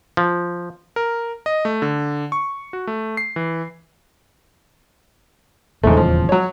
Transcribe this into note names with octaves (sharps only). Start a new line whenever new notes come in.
F3
A#4
D#5
A3
D3
C#6
F#4
A3
C7
E3
D#1 E2 G#2 C#3 A3
F3
F#3 C#5